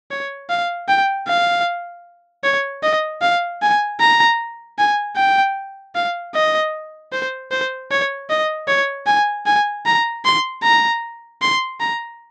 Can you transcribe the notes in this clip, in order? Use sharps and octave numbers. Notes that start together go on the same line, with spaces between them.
C#5
F5
G5
F5
C#5
D#5
F5
G#5
A#5
G#5
G5
F5
D#5
C5
C5
C#5
D#5
C#5
G#5
G#5
A#5
C6
A#5
C6
A#5